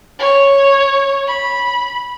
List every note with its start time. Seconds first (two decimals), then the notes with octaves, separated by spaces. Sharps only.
0.19 C#5
1.27 B5